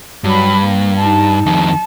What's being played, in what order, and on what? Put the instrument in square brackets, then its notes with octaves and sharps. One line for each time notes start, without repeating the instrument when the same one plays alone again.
[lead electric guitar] G2 [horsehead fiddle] F#3 B5
[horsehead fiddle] A#3
D#4 A5
[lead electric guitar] F2 D#3 [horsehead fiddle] A5